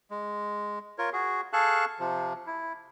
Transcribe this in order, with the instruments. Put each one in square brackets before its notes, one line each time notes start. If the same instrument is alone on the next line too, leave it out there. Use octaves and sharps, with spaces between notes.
[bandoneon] G#3
F4 A#4 C#5
F#4 G#4
G#4 A4 F5 A5 C#6 F#6
C3 F3
E4